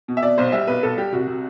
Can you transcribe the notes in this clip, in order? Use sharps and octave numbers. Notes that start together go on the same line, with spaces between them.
B2
E5
B2 D5
B1 C5
G3 E5
B1 B4
B1 A4
G3 G4
C2 F#4
C3